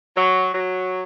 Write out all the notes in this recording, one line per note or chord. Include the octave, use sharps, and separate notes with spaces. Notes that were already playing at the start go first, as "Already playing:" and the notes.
F#3
F#3